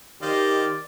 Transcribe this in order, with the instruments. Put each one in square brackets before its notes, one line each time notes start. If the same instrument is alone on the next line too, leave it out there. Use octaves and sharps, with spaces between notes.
[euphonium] D#3 [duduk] G4 [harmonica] C5 D#5 F5 [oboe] D5